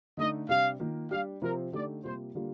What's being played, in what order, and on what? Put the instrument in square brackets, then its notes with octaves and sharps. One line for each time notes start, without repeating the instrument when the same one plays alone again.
[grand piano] D3 A3 D#4 [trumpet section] D#5
[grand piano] C3 G3 D4 G4 [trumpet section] F5
[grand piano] D#3 A#3 F4
[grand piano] G3 D4 G4 [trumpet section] F5
[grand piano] C3 F3 C4 F4 [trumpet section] A#4
[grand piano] D3 A3 D#4 G4 [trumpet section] D5
[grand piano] C3 G3 A#3 F4 [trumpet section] C5
[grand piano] D3 G3 A#3 F4